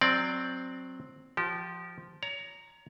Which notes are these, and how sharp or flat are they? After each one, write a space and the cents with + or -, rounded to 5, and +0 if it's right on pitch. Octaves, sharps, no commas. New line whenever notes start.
F#3 -15 C4 +0 D5 +0
F3 +0 G4 -30
C#5 +30 A#5 +0